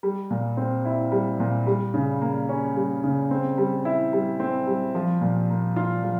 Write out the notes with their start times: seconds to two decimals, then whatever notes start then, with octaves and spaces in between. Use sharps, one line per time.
0.03 G3
0.31 A#2
0.57 C4
0.85 E4
1.12 G3
1.40 A#2
1.67 G3
1.94 C#3
2.21 A#3
2.49 C#4
2.76 G3
3.04 C#3
3.31 C4
3.58 G3
3.85 E4
4.13 G3
4.40 C4
4.67 G3
4.95 F3
5.21 A#2
5.49 A#3
5.76 F4
6.04 F3